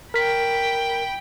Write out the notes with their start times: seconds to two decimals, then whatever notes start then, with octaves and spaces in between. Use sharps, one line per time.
0.14 A#4 G5 B5 B6